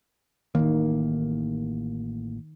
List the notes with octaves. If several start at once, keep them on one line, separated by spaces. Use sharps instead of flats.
A1 D#3 A#3